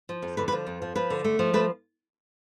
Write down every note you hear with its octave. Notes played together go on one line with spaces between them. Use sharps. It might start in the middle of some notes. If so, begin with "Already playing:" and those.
F3
F2
D3 B4
B4
F3
F2
F3
F3 B4
D3
A3
F3
A3 B4